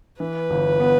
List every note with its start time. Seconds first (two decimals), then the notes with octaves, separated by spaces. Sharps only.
0.20 E3 B4
0.50 G1
0.80 B3